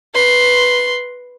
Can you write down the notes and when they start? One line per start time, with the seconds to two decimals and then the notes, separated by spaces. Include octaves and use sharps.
0.14 B4 C6